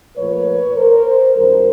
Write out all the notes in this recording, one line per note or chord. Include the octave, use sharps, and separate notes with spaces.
A#2 F3 A3 B4 C#5
A#4 C5
F#2 D#3 G3 A#4 C5